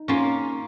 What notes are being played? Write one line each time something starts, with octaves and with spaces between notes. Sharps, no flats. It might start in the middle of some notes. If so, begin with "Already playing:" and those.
Already playing: D#4
A#3 C#4 F4